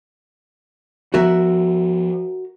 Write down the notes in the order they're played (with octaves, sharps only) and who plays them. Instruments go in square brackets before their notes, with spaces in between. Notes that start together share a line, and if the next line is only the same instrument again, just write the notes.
[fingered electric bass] F3 B3 [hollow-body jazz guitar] F#4 A#4 E5